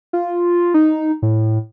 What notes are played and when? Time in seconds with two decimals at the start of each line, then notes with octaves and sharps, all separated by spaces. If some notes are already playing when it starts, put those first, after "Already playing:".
0.13 F4
0.74 D#4
1.22 A2